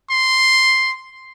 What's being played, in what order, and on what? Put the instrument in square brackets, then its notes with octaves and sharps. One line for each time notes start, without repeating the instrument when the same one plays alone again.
[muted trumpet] C6